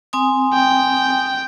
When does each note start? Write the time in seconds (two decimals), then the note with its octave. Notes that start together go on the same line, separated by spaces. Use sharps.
0.13 C4 G#5 D#6
0.53 G5